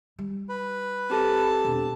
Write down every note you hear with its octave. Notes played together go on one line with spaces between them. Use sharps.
G3
B4
C4 G4 A4 A5
E1